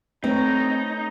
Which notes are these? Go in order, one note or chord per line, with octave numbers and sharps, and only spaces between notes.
A3 C4 D#4 B4 C#5 A#5